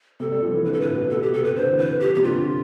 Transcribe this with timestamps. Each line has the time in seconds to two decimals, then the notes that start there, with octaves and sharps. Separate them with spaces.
0.20 C3 A4
0.32 G3
0.42 F3
0.54 E3
0.65 D3 B4
0.73 A4
0.80 A2 B4
0.95 B2
1.10 B2 A4
1.22 G4
1.33 C3 A4
1.44 B4
1.56 D3 C5
1.71 E3
1.79 B4
2.00 F3 G4
2.15 C3 G4
2.23 D3 F4